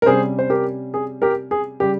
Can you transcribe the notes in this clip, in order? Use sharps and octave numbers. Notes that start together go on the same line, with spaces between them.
A#4
C3 G3 C#4 G#4 C5
C5
G4 A#4
G#4
G4 A#4
G#4
C#3 G3 G4